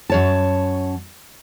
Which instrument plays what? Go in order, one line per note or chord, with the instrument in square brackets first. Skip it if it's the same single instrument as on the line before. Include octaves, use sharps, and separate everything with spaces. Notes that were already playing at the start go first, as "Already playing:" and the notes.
[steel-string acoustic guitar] F#2 C#5 A5